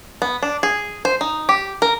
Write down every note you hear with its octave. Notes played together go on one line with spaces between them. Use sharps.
B3
D4
G#4
C5
D#4
G4
A#4